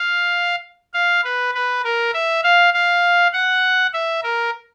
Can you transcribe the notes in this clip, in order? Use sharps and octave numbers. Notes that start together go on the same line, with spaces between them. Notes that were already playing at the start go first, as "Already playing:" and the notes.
Already playing: F5
F5
B4
B4
A#4
E5
F5
F5
F#5
E5
A#4